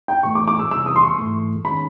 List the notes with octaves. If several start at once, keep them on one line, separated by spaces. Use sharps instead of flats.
G5
A2 E3 A3 C#6
D6
D6
E6
C3 E3 G3 E6
D#6
C6
C#6
G#2 E3 A3
D#3 G#3 C#4 B5